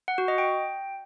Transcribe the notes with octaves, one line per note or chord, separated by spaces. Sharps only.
F#5
F#4
D#5
G5